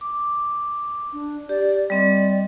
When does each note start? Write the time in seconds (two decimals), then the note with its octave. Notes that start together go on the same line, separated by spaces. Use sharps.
0.01 D6
1.13 D4
1.49 G4 D5
1.90 G3 C4 D5 D#5